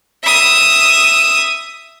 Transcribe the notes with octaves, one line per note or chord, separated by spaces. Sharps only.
E5 D#6